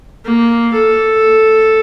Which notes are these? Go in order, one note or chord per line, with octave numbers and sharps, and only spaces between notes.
A#3
A4